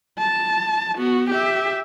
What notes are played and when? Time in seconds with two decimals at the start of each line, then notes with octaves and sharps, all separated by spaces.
0.18 A5
0.96 B3 F#4
1.31 G4 E5